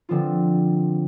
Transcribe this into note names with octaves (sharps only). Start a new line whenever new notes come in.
D3 F3 C4 F4